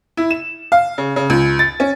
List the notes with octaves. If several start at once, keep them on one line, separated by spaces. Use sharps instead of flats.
E4
E7
F5
C#3
C#3
C#2
A6
C#4